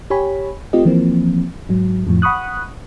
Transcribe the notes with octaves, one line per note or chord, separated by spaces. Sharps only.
G4 C#5 G#5 B5
A3 C4 F4 G4 D#5
E3 F3 A#3 C4
G#2 F#3
F2 A2 F3
F#5 B5 C#6 D#6 F#6